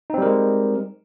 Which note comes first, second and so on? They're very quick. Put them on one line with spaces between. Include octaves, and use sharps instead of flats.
D#4 C4 G3 A#4 G#3